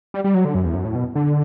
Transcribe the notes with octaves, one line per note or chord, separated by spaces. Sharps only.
G3
G3
F#3
D3
F#2
E2
F#2
A2
B2
D3